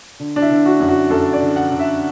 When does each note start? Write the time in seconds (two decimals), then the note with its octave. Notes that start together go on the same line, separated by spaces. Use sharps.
0.20 D3
0.36 D4
0.42 E4
0.51 D3
0.66 F#4
0.80 F#2
0.89 F#4
1.10 F#2 A4
1.33 D5
1.42 D3
1.56 F#5
1.71 D3
1.79 E5